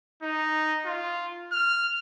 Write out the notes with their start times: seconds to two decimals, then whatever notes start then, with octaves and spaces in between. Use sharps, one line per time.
0.23 D#4
0.86 F4
1.53 F6